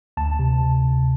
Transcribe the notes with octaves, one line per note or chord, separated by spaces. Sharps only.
D2 A5
C3